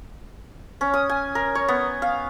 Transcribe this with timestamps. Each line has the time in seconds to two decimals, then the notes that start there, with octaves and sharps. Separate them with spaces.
0.81 C#4
0.94 D#6
1.09 G#5
1.35 A#4
1.55 C#5
1.68 B3
2.02 F5